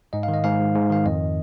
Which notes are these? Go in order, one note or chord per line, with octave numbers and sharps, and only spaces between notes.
G#2 D#5
F5
D#3
D#5
G#2 F5
G#2
G#2
D#3 F5
F2 D#5